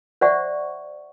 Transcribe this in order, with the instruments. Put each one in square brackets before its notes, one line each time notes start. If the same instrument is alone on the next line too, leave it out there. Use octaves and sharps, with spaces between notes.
[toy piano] C5 D5 E5 F#5 C#6